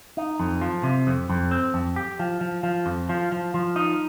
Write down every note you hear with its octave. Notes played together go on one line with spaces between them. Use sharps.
D#4
F2
F3
C3
F2
F2
C4
F2
G4
F3
F3
F3
F2
F3
F3
F3
D#4